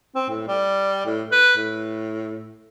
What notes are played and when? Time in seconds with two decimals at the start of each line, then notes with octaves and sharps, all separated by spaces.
0.15 C4
0.30 A2
0.48 G3
1.06 A2
1.32 B4
1.57 A2